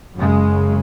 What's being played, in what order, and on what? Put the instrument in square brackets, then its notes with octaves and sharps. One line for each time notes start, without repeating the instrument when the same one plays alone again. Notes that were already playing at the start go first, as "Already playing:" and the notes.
[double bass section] F#1 F#2 C#3 G#3